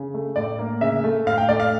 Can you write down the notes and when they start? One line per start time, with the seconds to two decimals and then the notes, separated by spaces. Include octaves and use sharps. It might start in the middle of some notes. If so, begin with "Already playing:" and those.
Already playing: C#3
0.14 A3
0.36 A2 D5
0.59 A#3
0.81 C#3 E5
1.04 A3
1.26 A2 F5
1.38 G5
1.49 A3 D5
1.60 F5